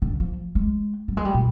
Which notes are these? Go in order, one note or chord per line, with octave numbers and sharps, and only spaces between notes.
D3
F3
G#3
G3
G#3
G3
A#2